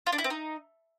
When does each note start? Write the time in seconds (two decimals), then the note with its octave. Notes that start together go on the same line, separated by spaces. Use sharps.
0.07 F4
0.12 D4
0.18 E4
0.24 C4
0.30 D#4